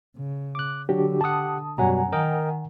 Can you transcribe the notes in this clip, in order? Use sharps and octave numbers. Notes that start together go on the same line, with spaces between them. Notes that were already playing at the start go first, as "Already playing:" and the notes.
C#3
D6 F#6
D3 F#3 D4 F#4 G4
G4 F#5 A5 D#6
F#2 B2 F#3 G3 F#5 G#5 A#5
D#3 A#4 D#5 G5